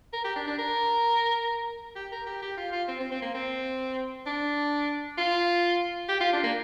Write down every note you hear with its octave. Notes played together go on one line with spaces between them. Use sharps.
A#4
G4
D4
D4
A#4
G4
A#4
G4
G4
F4
F4
C4
C4
C4
A#3
C4
D4
F4
G4
F4
D4
A#3